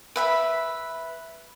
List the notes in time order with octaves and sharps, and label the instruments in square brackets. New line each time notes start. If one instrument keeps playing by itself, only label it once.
[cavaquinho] B4 E5 B5